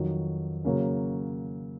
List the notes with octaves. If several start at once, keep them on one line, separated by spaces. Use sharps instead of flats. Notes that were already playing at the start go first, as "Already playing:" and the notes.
Already playing: F2 D#3 F#3
C#3 F#3 A#3 C#4